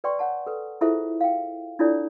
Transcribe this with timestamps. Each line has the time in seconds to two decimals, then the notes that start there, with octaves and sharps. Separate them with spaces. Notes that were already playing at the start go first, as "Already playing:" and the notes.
0.04 B4 D5 G5 C6 C#6
0.19 C#5 F#5 A5
0.46 A4 B4
0.81 E4 F4 G#4 A4 C5 E5
1.21 F5 G5
1.79 D4 E4 F4 A4 C#5 D5